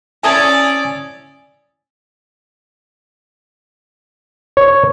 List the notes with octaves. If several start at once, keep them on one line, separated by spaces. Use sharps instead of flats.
C#4 E4 A4 D5 G#5 A5 D#6 G#6
C#5